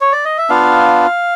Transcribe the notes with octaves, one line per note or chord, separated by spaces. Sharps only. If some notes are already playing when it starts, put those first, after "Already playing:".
C#5
D5
D#5
E5
B3 D4 F4 F5